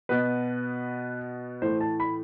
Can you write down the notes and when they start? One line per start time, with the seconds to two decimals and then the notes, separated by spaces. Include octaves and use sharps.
0.09 B2 B3 B4
1.62 A2 E3 A3 C5
1.81 A5
2.00 B5